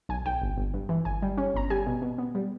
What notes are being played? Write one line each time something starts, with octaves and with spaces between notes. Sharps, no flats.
B1 G#5
B1 G5
G1
G1
G2
E3
G1 G#5
G3
C#4
G1 A#5
G3 G#5
B2
B2
B3
G3